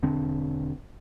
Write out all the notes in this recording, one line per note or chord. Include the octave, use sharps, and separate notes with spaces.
E1 D3 C4 D4